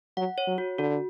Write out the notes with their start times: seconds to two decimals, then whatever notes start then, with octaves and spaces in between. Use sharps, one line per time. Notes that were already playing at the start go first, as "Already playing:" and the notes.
0.17 F#3 F#5
0.38 C#5
0.47 F#3
0.58 F#4
0.78 D3 F#4